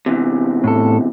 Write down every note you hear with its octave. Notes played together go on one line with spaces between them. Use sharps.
E2 C3
A2 A4